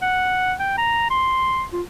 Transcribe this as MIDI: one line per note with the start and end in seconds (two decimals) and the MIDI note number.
0.02 0.54 78
0.59 0.74 79
0.78 1.07 82
1.10 1.64 84
1.72 1.82 65